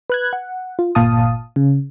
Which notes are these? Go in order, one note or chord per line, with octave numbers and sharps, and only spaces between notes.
B4 F#6 G#6
F#5
F4
G1 A#2 F5 A5 D#6
C#3